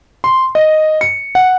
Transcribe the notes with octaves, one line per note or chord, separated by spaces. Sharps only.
C6
D#5
C#7
F#5